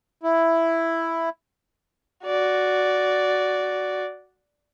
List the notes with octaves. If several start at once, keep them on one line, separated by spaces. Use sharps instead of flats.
E4
F#4 D5